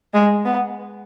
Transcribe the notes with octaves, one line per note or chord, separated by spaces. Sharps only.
G#3
B3